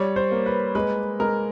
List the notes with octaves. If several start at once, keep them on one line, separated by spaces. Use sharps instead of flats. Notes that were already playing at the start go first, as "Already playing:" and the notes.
Already playing: G3 C#5
C5
A#3
B4
G#3 B4
G#3 A#4